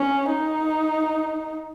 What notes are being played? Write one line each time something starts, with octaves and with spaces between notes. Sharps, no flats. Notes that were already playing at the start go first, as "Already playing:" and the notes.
Already playing: C#4
D#4